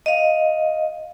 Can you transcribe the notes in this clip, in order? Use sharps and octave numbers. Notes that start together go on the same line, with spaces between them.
D#5 F5